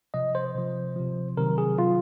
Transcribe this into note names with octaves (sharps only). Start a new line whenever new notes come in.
C3 F3 D#5
C5
C3 F3
C3 F3
C3 D#3 F#3 A#4
G#4
C3 F#3 F4